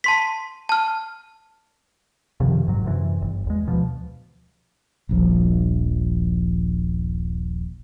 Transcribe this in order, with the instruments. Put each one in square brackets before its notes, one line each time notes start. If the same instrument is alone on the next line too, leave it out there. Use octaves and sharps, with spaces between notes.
[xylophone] A5 C6 B6
A5 F6
[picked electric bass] F#2 C3 D#3 F3
F#1 G#2 F#3
F#2 C3 D#3 E3
G1
E2 G#3
D2 B2 F3
[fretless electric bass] D#1 A#1 F3